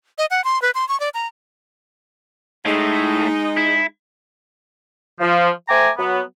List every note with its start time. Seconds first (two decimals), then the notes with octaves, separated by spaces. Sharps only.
0.18 D#5
0.31 F#5
0.44 C6
0.62 B4
0.75 C6
0.89 C#6
1.00 D5
1.14 A#5
2.66 A2 G#3 A3 D#4
3.57 E4
5.20 F3
5.69 A3 C5 G5 G#5 A#5 D6
5.98 F#3 B3